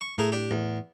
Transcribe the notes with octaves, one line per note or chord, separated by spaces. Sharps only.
C#6
A2 A3 G#4 A#4
D4 G4
E2 A2